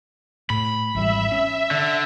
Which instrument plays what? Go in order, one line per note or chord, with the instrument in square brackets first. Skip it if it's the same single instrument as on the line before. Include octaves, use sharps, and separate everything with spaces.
[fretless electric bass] A2 [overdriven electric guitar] B5
[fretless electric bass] G#1 E3 G3 [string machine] E5
[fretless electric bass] C#4
[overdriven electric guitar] D3